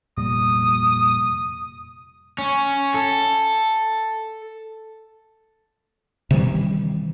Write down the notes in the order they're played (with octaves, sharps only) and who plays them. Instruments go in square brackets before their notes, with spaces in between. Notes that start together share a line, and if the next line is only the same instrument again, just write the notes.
[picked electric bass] F1 A#2 G3 [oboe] D#6
[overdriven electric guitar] C#4
A4
[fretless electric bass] C3 D#3 E3 G3